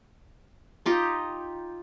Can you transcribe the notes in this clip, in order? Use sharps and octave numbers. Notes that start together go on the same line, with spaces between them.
D#4 F4 G4 D#5